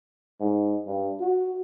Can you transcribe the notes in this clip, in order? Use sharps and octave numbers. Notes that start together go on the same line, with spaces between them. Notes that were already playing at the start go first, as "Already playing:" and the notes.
G#2
G2
F#4